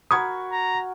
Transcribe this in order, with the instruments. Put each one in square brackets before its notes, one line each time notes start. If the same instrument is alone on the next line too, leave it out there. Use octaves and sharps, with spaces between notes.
[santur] F#4 A#4 [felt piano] B5 C#6 G#6 [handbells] D#6
[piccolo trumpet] A#5